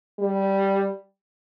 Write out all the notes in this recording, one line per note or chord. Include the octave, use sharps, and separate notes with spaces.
G3